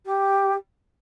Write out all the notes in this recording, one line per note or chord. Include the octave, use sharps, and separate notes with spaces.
G4